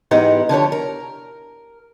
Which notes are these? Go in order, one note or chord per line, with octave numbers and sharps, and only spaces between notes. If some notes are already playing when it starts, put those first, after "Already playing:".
G#2 E3 B3 D#4 G4 F#5
D3 F3 G4 C#5
A#4